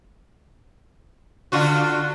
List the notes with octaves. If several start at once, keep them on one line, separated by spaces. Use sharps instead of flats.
D3 F4 F#4